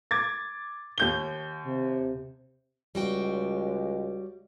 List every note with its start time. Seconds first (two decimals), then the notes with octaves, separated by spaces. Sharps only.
0.11 D6 G#6 A6
0.98 D#2 G6 G7
1.66 C3
2.95 C#2 G3 F#4 G5